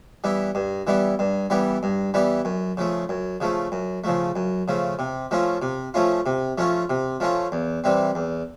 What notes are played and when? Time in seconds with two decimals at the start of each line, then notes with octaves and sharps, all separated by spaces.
0.24 E3 G3 B3 E4
0.55 G2
0.87 E3 G3 B3 E4
1.19 G2
1.50 E3 G3 B3 E4
1.83 G2
2.14 E3 G3 B3 E4
2.45 F#2
2.77 C#3 F3 A3
3.09 F#2
3.41 C#3 F3 A3
3.72 F#2
4.04 C#3 F3 A3
4.36 F#2
4.68 C#3 F3 A3
4.99 C3
5.31 F3 A3 C#4 F4
5.62 C3
5.94 F3 A3 C#4 F4
6.26 C3
6.58 F3 A3 C#4 F4
6.90 C3
7.20 F3 A3 C#4 F4
7.52 E2
7.84 C3 E3 G3 C4
8.15 E2